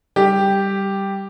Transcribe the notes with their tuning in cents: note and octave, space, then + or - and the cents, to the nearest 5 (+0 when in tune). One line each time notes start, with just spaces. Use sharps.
G3 +0 G4 +0